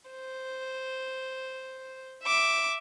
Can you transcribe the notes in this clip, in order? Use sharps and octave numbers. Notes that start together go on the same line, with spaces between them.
C5
E5 D6